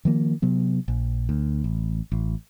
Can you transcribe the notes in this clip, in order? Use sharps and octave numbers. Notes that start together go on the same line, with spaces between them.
D#3 F3 A#3
C3 F#3 B3
A#1
D2
A1
A1